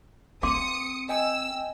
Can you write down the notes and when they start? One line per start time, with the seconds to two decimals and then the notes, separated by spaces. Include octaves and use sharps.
0.43 C4 F5 C6 D6 D#6 C#7
1.09 D#5 G5 G#5 E6